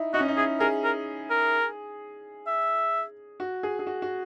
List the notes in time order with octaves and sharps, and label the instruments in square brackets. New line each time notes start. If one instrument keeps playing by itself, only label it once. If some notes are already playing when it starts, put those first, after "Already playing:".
Already playing: [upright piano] D#4 E4
[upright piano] D#4 [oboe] F#4
[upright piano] C#4
D#4
[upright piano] E4 [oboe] G#4
[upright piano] G#4 [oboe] A#4
[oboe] A#4
A#4
E5
[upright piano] F#4
G#4
G#4
F#4
F#4